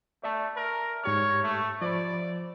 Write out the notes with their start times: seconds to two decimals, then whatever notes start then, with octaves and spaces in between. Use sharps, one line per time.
0.24 A3 D5 E5 A5
0.56 A#4
1.04 G#2 G4 C#5 F6
1.43 A3
1.82 F3 C5 D5 B5